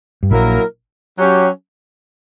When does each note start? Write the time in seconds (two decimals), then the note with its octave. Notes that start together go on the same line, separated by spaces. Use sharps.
0.23 G2
0.31 A#1 A#2 F#3 A#3 E4 A#4
1.17 F#3 C#4 G4